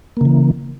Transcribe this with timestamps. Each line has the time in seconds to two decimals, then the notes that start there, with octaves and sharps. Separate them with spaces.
0.17 A#3
0.21 C#3
0.25 E3